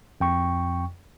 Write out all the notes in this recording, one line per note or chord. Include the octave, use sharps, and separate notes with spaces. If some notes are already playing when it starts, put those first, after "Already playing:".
F2 G5 C#6